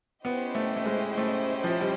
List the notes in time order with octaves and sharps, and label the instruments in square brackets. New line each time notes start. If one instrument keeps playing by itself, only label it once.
[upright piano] B3 [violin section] C#4 E4 G4 C5 D#5
[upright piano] A3
A3
G#3
A3
F3
G3